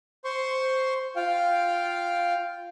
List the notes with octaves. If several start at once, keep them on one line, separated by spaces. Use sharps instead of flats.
C5 C6 C#6
F4 F5 G5